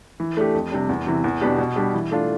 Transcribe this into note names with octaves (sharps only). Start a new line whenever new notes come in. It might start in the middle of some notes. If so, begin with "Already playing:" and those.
E3
A3 D4 G4
F2
C3 G3 D4
E2
C3 E3
E2
B2 B3 D4 G4
B2
G3 D4 G4
E3
A3 D4 F4